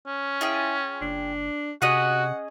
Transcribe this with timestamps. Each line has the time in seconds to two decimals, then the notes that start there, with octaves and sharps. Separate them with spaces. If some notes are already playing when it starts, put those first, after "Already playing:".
0.07 C#4
0.41 E4 F4 G#4 G5
1.01 F#1 D4
1.82 C3 C#4 F#4 G#4 D#5 F#5